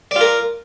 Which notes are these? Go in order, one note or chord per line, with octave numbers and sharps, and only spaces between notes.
F4 A#4 D5